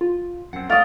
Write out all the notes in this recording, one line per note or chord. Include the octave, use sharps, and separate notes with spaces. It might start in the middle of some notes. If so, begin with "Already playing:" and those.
F4
F#2 C4 F#5
A3 D5 D#5 F5